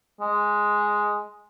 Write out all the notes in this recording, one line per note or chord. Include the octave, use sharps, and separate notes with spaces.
G#3